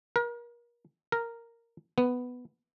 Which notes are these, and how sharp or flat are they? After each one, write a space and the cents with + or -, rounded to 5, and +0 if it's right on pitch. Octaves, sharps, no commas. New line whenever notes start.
A#4 +35
A#4 -5
B3 +5